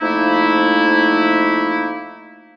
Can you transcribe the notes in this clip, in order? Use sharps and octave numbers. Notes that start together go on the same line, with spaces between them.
F2 F3 A3 A#3 D#4 E4